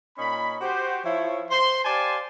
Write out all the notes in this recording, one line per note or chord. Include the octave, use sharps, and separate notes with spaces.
A#2 C#4 D#4 B5
F#4 G4 C5
F3 E4 C#5
C5 C6
G4 C5 D5 F5 G#5 A5